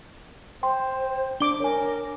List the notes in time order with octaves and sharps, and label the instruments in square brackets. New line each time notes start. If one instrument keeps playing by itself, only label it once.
[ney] C5 [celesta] G5 C6
[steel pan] D4 D6 [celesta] G7
[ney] A#4 [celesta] C#5 G#5